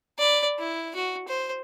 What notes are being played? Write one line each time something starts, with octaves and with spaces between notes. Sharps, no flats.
D5 B5
E4
F#4
C5